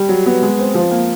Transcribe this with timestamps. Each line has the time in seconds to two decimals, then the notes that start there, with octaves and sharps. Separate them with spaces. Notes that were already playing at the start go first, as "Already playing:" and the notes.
Already playing: G3
0.09 F#3
0.26 B3
0.42 G#3
0.59 C4
0.75 F3
0.91 A#3